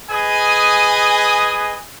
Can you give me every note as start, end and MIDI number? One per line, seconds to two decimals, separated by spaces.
0.10 1.75 68
0.10 1.75 71
0.10 1.75 75
0.10 1.75 80
0.10 1.75 87